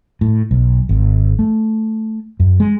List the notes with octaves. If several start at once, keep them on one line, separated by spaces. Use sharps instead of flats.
A2
B1
G#1
A3
F#2
G#3